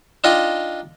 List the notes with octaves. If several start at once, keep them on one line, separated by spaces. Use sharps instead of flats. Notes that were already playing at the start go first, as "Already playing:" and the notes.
D4 D#4 F4 D#5 G5